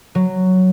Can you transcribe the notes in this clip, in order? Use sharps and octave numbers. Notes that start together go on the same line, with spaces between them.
F#3